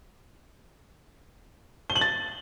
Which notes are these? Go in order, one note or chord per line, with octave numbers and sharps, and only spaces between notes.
G7
F#7
A6